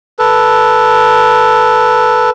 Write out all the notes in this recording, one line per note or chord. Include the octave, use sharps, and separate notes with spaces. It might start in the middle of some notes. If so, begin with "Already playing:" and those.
A4 B4